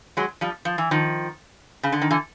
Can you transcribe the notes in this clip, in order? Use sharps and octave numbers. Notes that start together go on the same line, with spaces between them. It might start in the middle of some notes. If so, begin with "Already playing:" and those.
F#3 G#3
F3 G3
F3
E3
D#3 F3
C#3
D3
D#3
D3 E3